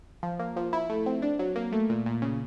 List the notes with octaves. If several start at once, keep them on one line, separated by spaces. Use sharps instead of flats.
F3
A#3
F3
E4
A3
C4
D4
F#3
A#3
A3
A#2
A#2
C#3